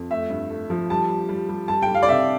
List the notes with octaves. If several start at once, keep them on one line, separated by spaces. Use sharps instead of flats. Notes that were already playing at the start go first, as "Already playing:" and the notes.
Already playing: F2
A3 E5
G2
A3
F3
G3 A5
G3
G3
G3
G3 A5
G5
G3
F5
D5
C3 E5